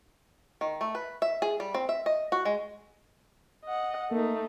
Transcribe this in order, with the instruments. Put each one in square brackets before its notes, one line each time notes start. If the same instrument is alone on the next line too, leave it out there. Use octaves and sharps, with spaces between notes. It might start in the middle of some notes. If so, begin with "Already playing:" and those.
[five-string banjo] D#3
A3
B4
E5
G#4
G3
C4
E5
D#5
F#4
G#3
[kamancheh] D#5 F#5
[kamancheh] A3 D#4 [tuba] A#3